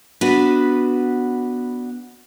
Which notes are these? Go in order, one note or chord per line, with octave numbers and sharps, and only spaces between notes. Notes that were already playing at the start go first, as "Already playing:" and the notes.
B3 D4 F#4 B4